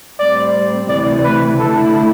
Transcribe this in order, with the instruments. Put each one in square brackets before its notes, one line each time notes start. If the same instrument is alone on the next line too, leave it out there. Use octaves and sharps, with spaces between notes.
[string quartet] A2 G3 C4 [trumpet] D5
[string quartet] D2 C3 E3 [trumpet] D5
[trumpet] B4
[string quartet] D3 A3 E4 [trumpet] A4